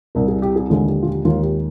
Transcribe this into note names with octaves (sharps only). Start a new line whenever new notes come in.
C2 C3 G3 A#4
G#4
G4
G#4
D#2 D3 F3 G#3 F4
G4
F4
G4
D#2 D#3 G#3 D#4 F4
G4